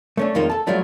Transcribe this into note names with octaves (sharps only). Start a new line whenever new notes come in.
A3 C#4 D4
F2 D#3 G#3 A#3 F4
A4 A5
G2 F3 F#3 A3 D4